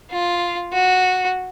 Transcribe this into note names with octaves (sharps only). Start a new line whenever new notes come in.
F4
F#4